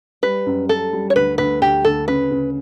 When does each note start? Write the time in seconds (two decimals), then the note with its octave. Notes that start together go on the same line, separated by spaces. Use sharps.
0.23 G3 B4
0.46 F#2
0.69 F#2 A4
0.93 G3
1.10 C#5
1.16 D2 B4
1.38 D2 B4
1.62 D2 G4
1.85 D2 A4
2.08 C#3 B4
2.31 C#3